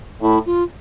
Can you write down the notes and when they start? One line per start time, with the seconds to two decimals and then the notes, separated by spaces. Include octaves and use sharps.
0.22 A2 E4
0.46 F4